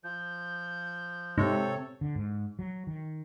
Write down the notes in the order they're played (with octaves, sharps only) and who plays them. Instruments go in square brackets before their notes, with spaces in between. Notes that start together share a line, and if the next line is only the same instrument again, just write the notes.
[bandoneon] F3 [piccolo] G6
[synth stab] G#2 [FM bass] C3 [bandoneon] A4 C#5
[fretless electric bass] D3
G#2
F#3
D#3